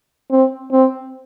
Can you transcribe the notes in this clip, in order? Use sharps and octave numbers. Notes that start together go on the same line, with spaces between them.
C4
C4